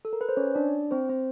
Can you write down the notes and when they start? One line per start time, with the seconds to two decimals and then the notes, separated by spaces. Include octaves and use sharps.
0.05 A4
0.13 A#4
0.21 B4
0.29 C5
0.37 C#4 C#5
0.55 D4 D5
0.91 C4 C5
1.09 C4 C5